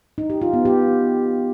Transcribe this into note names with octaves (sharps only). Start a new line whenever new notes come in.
D#4
G4
F4
B3
G4